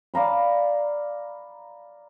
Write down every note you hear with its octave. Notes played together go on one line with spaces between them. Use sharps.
D5 F5 A#5 B5